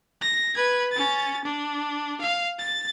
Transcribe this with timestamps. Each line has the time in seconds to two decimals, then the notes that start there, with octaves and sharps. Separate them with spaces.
0.22 A#6
0.56 B4 G#6
0.92 C#4 A6
1.44 D4
2.21 F5
2.59 A6